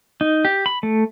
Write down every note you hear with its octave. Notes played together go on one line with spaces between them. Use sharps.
D#4
G4
B5
A3